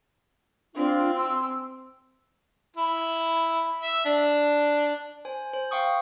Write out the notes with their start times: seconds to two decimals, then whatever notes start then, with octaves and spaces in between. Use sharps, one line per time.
0.75 C4 D4 F4
1.14 G#5 C6 E6
2.76 E4
3.81 E5
4.05 D4
5.25 C5 G#5
5.53 C5
5.71 F5 G5 C#6 D#6